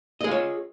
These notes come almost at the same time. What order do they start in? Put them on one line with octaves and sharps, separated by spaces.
D#5 G#4 F4 C#5